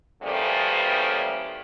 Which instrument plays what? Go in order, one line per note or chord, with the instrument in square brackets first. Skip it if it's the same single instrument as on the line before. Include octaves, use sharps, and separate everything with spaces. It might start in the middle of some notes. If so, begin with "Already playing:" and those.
[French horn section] C#3 E3 F3 G3 A3 A#3